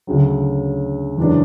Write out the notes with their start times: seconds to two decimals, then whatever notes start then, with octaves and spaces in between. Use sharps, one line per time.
0.07 D2 C#3 F#3
1.17 F#1 E2 C#3 G#3 D4